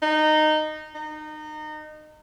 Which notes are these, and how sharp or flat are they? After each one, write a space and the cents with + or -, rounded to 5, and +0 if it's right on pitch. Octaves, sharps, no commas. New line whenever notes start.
D#4 -15
D#4 -25